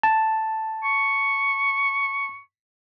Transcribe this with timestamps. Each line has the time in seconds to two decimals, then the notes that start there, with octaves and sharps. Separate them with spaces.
0.03 A5
0.84 C#6